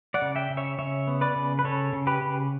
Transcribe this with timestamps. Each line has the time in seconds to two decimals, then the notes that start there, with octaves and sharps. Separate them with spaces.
0.14 D5 F#5
0.22 C#3
0.36 E5 G5
0.50 C#3
0.57 C#5 E5
0.78 C#3 C#5 E5
1.07 B3
1.21 B4 D5
1.36 C#3
1.59 B4
1.64 C#3 A4 C#5
1.93 C#3
2.07 G4 B4
2.21 C#3